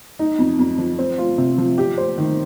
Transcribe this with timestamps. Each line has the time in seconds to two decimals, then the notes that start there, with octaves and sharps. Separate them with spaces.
0.19 D#4
0.39 F2
0.59 F2
0.78 F3
0.99 C4
1.18 F4
1.38 C3
1.58 F3
1.78 G4
1.98 C5
2.18 D#3